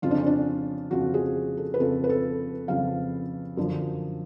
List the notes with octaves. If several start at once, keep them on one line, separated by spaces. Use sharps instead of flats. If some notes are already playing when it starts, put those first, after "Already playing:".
F2 C#3 F3 F4
D4
C#4
D4
F2 C#3 F3 F#4
G#4
A4
B4
F2 C#3 F3 A4
B4
A4
F2 C#3 F3 F5
F#2 D3 F3